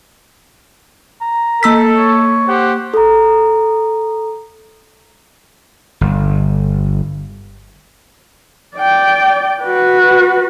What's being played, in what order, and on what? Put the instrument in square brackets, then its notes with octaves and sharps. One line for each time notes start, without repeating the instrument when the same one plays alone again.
[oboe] A#5
[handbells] A#3 E6 B6 [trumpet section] A4
[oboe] C#5
[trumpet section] G4 C5 F#5
[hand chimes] A4 A#5
[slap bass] G1
[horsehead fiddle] D5 G5
F#4 B4